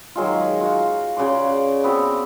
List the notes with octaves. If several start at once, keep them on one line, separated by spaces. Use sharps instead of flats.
D#3 F#3 G#3 F4
F4 F#4
C#3 F#4 D5 C6
B3 C4 F#4